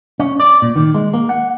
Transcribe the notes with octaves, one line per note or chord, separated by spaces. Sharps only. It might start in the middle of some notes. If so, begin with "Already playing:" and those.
C#4
D5
A#2
D#3
G#3
A#3
F#5